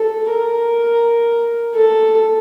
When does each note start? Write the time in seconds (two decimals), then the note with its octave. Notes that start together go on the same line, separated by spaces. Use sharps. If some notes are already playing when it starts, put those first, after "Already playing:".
Already playing: A4
0.31 A#4
1.74 A4